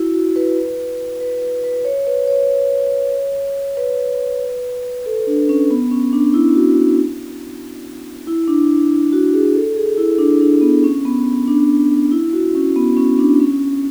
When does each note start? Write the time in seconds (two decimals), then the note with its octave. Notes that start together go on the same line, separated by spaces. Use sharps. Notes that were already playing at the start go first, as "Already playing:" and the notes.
Already playing: E4 F#4
0.14 F#4
0.36 B4
1.21 B4
1.42 B4
1.64 B4
1.85 C#5
2.07 B4
2.27 C#5
3.77 B4
5.06 A4
5.27 D4
5.49 C#4
5.71 B3
5.91 C#4
6.13 D4
6.34 E4
6.55 F#4
8.27 E4
8.47 D4
9.12 F#4
9.33 G#4
9.55 A4
9.77 G#4
9.98 E4
10.19 D4
10.41 D4
10.61 B3
10.84 C#4
11.05 B3
11.48 D4
12.12 E4
12.33 F#4
12.55 C#4
12.76 B3
12.97 C#4
13.19 D4
13.40 C#4